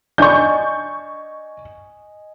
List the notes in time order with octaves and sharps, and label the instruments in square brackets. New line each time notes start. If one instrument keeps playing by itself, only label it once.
[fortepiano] D4 [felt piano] D#5 G#5 [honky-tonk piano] C#6 G6